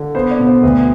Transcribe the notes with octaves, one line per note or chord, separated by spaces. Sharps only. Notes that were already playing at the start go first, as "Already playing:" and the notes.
Already playing: D3
B3 C5
D5
B2
C5
D2 B4